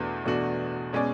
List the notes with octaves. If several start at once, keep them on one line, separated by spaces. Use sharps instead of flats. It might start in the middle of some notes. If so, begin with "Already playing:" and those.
Already playing: E2 B2 A3 D4 F#4
E2 B2 A3 D4 F#4
B2 G#3 C#4 G#4 D5